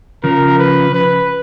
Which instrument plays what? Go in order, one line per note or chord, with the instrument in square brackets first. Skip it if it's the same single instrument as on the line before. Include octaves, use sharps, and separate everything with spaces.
[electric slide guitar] C#3 F3 [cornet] A#4
[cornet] B4
B4